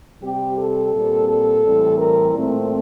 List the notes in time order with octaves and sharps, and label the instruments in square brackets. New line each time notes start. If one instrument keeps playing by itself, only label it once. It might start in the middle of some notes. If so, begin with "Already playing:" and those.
[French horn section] C3 G3 C4 G4
A4
A#2 G3 C4
A4
A2 E3 G3 C4
A#4
A#2 A3 C4